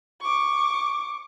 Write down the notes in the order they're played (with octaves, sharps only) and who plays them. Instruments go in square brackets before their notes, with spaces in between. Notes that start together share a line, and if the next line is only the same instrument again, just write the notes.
[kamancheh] C#6 D6